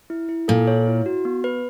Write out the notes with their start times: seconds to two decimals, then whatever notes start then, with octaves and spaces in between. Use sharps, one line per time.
0.10 E4
0.29 E4
0.48 A#2 A4
0.67 C#5
0.87 E4
1.06 F#4
1.25 B3
1.44 B4